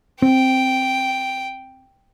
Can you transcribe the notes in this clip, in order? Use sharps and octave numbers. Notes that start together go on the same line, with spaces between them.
C4 G5